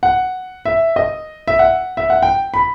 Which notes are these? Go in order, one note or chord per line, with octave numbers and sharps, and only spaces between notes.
F#5
E5
D#5
E5
F#5
E5
F#5
G5
B5